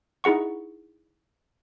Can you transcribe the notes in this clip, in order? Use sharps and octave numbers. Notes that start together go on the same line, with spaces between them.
D#4 E4 G#4 F#5 C#6